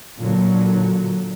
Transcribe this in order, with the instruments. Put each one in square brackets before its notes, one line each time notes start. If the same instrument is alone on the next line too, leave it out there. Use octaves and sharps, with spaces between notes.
[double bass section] A#2 D3 F#3